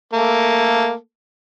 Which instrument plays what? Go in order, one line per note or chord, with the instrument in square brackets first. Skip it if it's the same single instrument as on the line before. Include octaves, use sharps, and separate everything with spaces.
[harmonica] A3 A#3 A4